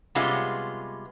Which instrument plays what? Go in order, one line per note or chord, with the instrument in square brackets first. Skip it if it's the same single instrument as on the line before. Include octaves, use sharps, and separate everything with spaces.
[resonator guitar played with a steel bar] C3 G3 G#3 B3 C#4 F4